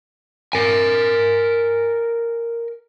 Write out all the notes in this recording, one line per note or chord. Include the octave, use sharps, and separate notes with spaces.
A#4 G#5